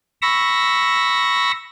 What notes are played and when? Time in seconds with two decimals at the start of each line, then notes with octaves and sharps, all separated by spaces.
0.22 B5 C#6 E6 A#6